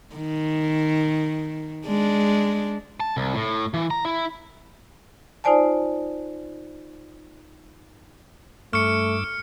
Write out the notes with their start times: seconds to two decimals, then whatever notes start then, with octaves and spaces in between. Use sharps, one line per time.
0.15 D#3
1.87 G#3 D4
3.00 A5
3.17 C2
3.34 A2
3.74 E3
3.91 A#5
4.05 E4
5.44 D#4 F4 C5 D5 G#5 A5
8.73 G2 A3 C#6 D6 E6 F6 C#7